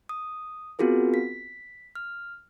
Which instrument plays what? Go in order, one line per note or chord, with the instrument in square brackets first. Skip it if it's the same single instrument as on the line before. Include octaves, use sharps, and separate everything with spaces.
[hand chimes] D#6
B3 C4 F4 F#4 G#4 A#4
B6
F6